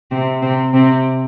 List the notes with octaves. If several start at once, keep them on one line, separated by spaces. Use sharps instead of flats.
C3 C4
C3 C4
C3 C4